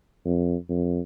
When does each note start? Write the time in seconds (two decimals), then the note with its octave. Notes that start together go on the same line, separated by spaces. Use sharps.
0.25 F2
0.69 F2